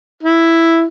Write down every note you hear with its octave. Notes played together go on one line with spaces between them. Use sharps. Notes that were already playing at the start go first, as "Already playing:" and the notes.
E4